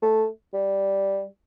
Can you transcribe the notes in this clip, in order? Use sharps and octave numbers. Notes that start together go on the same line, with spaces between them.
A3
G3